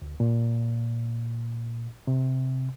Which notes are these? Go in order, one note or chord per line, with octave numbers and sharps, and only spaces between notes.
D2
A#2
C3